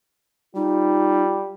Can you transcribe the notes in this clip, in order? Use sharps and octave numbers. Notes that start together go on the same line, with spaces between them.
G3 D#4 F4